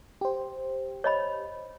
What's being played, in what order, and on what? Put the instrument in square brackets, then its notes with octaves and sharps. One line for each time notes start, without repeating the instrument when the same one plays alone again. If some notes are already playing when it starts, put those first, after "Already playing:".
[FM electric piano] G4 C5
[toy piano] C#5 D#5 B5